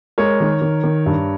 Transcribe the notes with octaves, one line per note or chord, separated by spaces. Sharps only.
G#3 A#4 C#5
D#3
D#3
D#3
G2